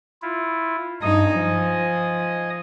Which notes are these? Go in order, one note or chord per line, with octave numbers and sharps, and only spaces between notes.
E4 F4
G2 D#4 D#5 G#5 D#6
F3